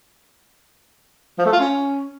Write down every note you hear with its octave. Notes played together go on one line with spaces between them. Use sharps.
F3
A3
F4
C#4